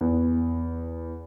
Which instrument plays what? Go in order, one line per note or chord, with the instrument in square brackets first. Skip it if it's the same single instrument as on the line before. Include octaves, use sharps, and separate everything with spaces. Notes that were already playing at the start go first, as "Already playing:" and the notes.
[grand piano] E2